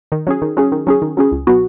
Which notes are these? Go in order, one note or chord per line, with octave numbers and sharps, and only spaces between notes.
D#3
F#3 C#4 G#4
D#3
F#3 C#4 G#4
D#3
F#3 C#4 G#4
D#3
F#3 C#4 G#4
C#2
B2 F#3 B3 F#4